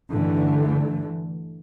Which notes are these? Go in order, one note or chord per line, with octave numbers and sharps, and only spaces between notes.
G2 D3 E3 A3